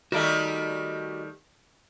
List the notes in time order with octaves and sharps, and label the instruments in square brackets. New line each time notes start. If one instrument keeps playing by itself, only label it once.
[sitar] D#3 G3 A3 [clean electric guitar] F#4 D5 D#5